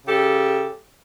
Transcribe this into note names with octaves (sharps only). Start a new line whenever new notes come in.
C#3 G4 A4